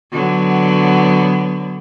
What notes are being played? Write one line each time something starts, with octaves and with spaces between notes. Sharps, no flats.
D3 F#3 B3